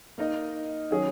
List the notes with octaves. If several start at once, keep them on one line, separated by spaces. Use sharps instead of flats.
A#3 D#4 A#4 D#5
D#3 F#3 C#4 G#4